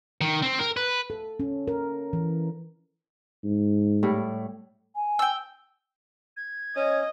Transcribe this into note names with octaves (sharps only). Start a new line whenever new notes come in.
D#3
C4
A#4
B4
A4
C#4
A#4
E3
G#2
A2 G3
G#5
G5 E6
G#6
C#4 D#5